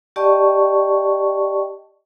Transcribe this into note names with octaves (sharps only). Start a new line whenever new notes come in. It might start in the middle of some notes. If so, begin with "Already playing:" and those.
G4 D5 D#5 G5 A5 C#6